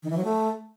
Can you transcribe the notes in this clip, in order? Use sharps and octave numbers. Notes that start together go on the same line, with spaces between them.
D#3
E3
F#3
A3